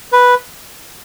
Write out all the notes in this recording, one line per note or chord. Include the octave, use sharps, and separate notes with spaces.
B4